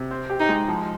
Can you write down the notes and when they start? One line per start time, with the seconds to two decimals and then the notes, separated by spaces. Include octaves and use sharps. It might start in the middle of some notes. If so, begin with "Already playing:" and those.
Already playing: C3
0.11 C4
0.30 G4
0.40 D#4
0.49 G#3
0.68 F3